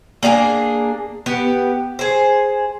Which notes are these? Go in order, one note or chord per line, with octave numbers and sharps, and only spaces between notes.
A#3 D4 G4 G#4
B3 G4
G#4 C5